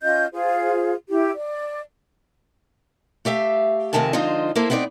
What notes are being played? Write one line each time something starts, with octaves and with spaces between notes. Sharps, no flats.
C#4 F4 D#5 G6
F4 G#4 C5
E4 G4
D5
A3 G4 E5 F5
F2 C3 D#3 A3 G#5 A5
D3 F3 G#3 D#4 F4 C5
A#3 E4 A4 C5
B3 C4 D#4 E4 D5